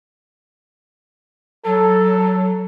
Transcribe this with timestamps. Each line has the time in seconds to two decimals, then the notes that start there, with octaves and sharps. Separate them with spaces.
1.65 F#3 A4